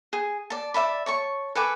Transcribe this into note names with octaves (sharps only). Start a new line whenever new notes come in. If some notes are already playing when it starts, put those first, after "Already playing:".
G#4
D5 A5
D5 E5 A5 B5
C#5 A5 C#6
A4 B4 G#5 D6